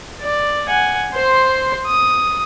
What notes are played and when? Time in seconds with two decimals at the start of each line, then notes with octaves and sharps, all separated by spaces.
0.22 D5
0.68 F#5 G#5
1.14 C5 C6
1.87 D#6